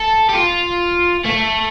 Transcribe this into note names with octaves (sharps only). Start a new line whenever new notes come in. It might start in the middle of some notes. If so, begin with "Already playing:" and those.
Already playing: A4
G4
F4
A3